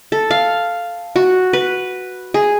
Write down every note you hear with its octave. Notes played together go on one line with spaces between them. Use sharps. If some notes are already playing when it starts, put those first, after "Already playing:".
A4
F5
F#4
B4
G#4